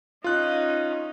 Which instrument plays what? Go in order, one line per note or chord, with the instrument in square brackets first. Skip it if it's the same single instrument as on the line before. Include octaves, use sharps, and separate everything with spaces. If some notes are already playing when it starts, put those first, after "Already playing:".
[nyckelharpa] C#4 D#4 [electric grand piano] F4 F#6